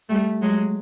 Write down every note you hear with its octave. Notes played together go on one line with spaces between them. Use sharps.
G3 A3
F#3 G#3